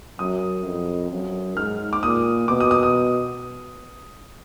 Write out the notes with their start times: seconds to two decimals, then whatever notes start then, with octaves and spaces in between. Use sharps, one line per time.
0.19 F#2 D#6
0.65 F2
1.10 F#2
1.56 G#2 F6
1.93 D6
2.03 A#2 D#6
2.48 B2 D6
2.60 D#6
2.71 D#6
2.83 D#6